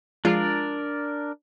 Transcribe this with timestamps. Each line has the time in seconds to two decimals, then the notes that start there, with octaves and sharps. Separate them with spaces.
0.25 F3 G#3 D4 F4 A#4 D5